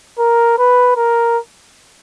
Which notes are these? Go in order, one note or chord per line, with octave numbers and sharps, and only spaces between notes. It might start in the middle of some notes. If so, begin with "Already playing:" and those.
A#4
B4
A#4